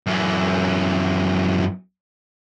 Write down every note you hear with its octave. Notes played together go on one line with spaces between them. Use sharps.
F#2 E3